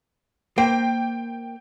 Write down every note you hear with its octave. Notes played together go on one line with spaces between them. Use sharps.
A#3 C5 G5